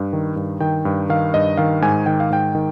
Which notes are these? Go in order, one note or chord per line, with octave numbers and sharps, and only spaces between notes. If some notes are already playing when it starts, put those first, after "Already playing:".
Already playing: G2
D#3
G2
D#3 G5
G2
D#3 F5
G2 D#5
D#3 F5
G#2 G#5
D#3 G5
F5
G#2 G5
D#3